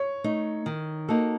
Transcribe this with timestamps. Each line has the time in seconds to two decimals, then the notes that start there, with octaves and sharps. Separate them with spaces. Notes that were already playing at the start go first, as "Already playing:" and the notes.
Already playing: C#5
0.24 A3 D#4
0.66 D#3
1.08 A#3 D#4 F#4 A4